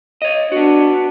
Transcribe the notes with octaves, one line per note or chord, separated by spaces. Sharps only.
C#5 D#5
B3 D4 F#4